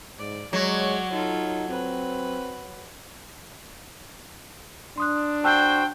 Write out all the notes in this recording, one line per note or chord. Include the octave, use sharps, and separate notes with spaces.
G#2 D5
F#3 G#3 C#5 D5
D#4 F4 A4
C4 B4
D4 C6 D#6 F#6
F#4 C5 G5 A5 E6 F#6